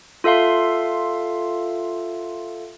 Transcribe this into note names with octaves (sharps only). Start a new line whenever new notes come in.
F4 A4 E5 F5 C6